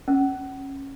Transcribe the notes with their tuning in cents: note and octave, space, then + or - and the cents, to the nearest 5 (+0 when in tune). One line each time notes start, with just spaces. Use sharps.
C#4 -20